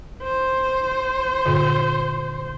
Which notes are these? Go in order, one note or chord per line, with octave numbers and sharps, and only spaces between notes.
C5
G2 A#2 D3